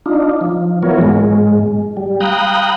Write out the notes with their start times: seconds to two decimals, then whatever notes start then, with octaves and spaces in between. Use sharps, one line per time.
0.06 D4 D#4 F4
0.41 F3
0.83 E3 F#3 B3 F4 A#4 C#5
1.01 G#2 G#3
1.97 G3
2.21 F5 G5 A#5 B5 D#6 F#6